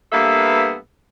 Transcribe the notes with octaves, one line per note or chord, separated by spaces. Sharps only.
G2 A#3 B3 A4 E5 F5